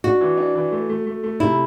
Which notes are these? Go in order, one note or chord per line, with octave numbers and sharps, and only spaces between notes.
D4 F#4
E3
D4
E3
A3
A3
A3
A3
C3 E4